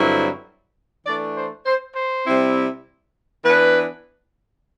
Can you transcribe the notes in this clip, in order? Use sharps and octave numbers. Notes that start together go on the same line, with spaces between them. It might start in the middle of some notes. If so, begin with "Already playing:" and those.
Already playing: G2 D3 F#3 C4 E4
E3 A3 D4 D5
C5
C5
C5
C3 G3 C4 E4
E3 B3 D4 B4